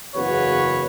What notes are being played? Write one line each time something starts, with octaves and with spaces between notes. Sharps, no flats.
F#1 E2 C#3 F#4 B4 C#5